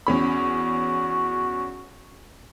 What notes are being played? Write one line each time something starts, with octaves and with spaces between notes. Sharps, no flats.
E2 C#4 F#4 B5